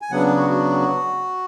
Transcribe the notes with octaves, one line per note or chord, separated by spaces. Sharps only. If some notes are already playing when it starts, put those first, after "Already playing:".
G#5
C#3 F#3 B3 D4 F#5
F#4
F#4